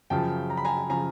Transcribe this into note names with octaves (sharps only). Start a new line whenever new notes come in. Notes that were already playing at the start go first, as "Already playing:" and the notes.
F#2 C#3 F3 G5 A5
A#5
B5
G#5 A#5
C#3 F3 G#5 A#5